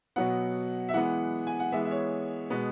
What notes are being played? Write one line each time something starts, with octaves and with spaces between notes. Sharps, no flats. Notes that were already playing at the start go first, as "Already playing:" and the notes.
B2 F#3 B3 F#5
E5
E3 G#3 B3 F#5
G#5
F#5
E3 G#3 B3 E5
E5
C#5
B2 G#3 B3